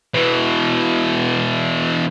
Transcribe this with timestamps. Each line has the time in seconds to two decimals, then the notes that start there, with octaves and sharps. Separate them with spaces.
0.14 B2 E3